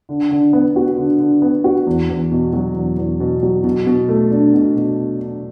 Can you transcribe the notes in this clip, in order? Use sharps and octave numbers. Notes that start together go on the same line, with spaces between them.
D3
D3
B3
F#4
D3
D3
B3
F#4
E2
E2
B2
F#3
E2
E2
B2
F#3
B2
B2
A3
D4
B2
B2